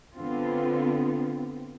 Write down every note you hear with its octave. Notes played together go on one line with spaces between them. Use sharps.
D3 B3 C4 F4